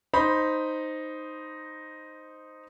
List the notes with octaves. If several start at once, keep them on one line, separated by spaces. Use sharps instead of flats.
D#4 C5 B5